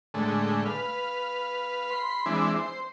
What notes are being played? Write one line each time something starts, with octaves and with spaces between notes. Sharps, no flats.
A2 D3 G#3 A3
B4 F5
B5 C6
E3 G#3 C4 D4 E4
C5